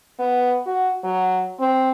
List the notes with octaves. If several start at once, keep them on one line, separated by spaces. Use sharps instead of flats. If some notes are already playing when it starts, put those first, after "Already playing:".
B3
F#4
F#3
C4